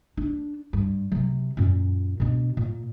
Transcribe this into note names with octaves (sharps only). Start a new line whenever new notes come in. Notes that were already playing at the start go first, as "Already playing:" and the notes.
D4
G2
C3 F#3
F#2 A#2
B2 D4
A#2